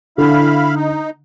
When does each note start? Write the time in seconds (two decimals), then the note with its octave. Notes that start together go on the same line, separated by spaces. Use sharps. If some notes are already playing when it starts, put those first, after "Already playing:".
0.18 D3 E4 F5 B5
0.75 D#4